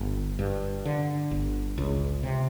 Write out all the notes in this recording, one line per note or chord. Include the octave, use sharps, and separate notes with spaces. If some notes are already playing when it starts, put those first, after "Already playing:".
Already playing: G1
G2
D3
G1
C#2
C3